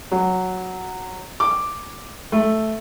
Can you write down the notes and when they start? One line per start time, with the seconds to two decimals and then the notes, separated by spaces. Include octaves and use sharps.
0.12 F#3
1.40 D6
2.32 A3